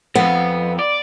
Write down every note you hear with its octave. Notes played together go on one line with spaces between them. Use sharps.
F2 B3
D5